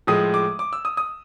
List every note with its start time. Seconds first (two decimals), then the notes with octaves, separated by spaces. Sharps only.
0.07 A2 F3 G#3 D#6
0.34 D6
0.59 D6
0.73 E6
0.85 D#6
0.97 D#6